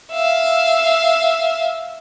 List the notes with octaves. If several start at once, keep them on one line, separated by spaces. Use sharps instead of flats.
E5 F5